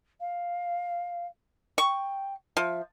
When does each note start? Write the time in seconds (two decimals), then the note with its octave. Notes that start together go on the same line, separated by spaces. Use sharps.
0.20 F5
1.78 G5 C#6
2.57 F3 E5